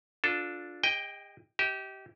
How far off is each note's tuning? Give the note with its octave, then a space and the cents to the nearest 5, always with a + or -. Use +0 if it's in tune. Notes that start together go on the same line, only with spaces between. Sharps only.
D4 -5 F4 +20 A4 +0
G#4 -45 D#5 +5 G5 +0
G4 -20 D#5 +45